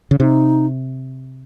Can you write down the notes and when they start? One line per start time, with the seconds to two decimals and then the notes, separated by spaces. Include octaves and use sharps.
0.11 C#3
0.20 C3 D#4